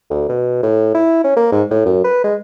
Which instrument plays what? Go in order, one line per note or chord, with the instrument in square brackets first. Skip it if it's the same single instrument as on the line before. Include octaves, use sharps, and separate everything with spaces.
[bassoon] D2
B2
A2
E4
C#4
A#3
G#2
A2
F#2
B4
G#3